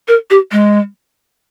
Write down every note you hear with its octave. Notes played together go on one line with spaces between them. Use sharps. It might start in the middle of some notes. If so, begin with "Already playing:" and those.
A#4
G4
G#3